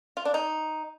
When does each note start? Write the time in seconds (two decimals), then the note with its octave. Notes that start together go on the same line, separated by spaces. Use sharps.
0.17 F4
0.25 D4
0.34 D#4